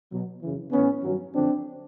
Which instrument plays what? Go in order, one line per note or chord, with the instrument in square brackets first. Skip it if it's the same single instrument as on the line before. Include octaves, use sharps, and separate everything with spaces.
[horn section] B2 F#3
F#2 C#3 E3
A2 E3 B3 C#4
G2 D#3 F#3
F#2 D3 F3 C4 D4